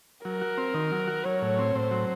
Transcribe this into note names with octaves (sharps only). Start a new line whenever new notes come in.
F#3 A#4
F#4
C4
D#3
F#3
F#4
F#3 C#5
A2
C4
A2 C5
F#3